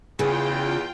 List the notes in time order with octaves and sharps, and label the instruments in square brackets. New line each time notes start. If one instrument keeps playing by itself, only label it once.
[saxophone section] E2 [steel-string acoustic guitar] C#3 [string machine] F4 G5 [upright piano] G#4